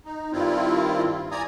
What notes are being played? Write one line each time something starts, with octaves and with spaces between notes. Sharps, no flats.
D#4
G2 D#3 G3 C4 E4 F4
D5 G#5 A#5 D#6